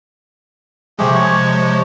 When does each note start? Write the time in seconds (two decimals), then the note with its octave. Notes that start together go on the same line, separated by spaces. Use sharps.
0.99 C3 F3 G#3 A3 G4 G#4
1.15 C#5 C#6